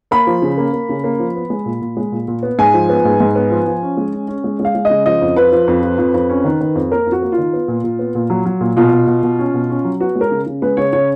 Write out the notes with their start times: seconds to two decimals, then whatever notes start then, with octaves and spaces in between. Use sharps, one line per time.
0.11 A#3 B5
0.27 F3
0.42 C#3
0.57 A#3
0.73 A#3
0.89 C#3
1.04 A#3
1.19 F3
1.35 B3
1.50 G#3
1.66 A#2
1.81 A#2
1.97 G#3
2.12 A#2
2.28 A#2
2.43 B3
2.59 G#2 G#5
2.74 F3
2.89 B3
3.05 G#2
3.20 G#2
3.35 B3
3.51 F3
3.67 F3
3.82 C#4
3.97 G#3
4.13 C#4
4.28 C#4
4.44 G#3
4.60 G#3
4.65 F5
4.75 G#3
4.85 C#3 D#5
5.06 F3 D#5
5.22 F2
5.36 F3 B4
5.52 F3
5.68 F2
5.83 F3
5.98 F2
6.14 F2
6.29 C#4
6.45 D#3
6.61 D#3
6.75 F2
6.92 A#3 A#4
7.06 F2
7.12 F#4
7.22 A#3
7.32 F4
7.38 D#3
7.53 B3
7.68 A#2
7.84 A#2
7.99 B3
8.15 A#2
8.30 F#3
8.46 F#3
8.61 A#2
8.77 B2 F4
8.92 B2
9.07 B2
9.23 B2
9.39 C#4
9.54 B2
9.70 C#4
9.84 F#3
10.00 B3 F#4
10.16 G#3
10.21 A#4
10.31 C#3
10.46 C#3
10.62 G#3 B4
10.77 C#3 C#5
10.93 C#3 C#5